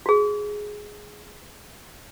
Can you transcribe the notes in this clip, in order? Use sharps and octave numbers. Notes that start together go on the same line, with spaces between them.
F#4 G#4